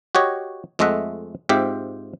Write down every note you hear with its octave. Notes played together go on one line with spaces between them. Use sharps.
F#4 G4 C#5 D#5
F2 G#3 A3 D#5 E5 F#5
G#2 C4 F4 G4 E5